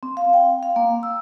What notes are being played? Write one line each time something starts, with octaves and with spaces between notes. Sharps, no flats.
C4
F5
G5
F5
A#3
E6